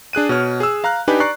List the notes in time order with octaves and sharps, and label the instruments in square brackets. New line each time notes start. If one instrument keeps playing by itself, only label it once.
[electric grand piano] D4 G#4 F#6 D#7
B2 C#5 F6
G#4 E6
F5 A#5 F6 F#6
D4 D#4 G4 B4 G#5
D5 A#5 C#6 F#6 C7